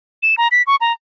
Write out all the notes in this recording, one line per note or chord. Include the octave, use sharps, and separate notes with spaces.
E7
A#5
B6
C#6
A#5